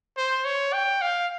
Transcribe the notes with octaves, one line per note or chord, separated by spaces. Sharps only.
C5
C#5
G5
F5